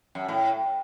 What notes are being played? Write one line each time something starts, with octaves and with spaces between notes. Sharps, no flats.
F#2
A2